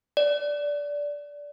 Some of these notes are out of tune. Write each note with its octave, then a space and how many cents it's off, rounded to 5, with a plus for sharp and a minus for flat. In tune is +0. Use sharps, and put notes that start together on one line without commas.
D5 -15